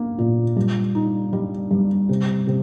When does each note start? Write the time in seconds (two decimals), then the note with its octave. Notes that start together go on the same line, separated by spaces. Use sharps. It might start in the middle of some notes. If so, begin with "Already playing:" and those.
Already playing: A#3
0.19 A#2
0.57 G2
0.95 D#4
1.33 G3
1.71 G2
2.09 C3
2.47 C3